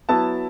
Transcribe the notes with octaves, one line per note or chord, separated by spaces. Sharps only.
F#3 B3 E4 A5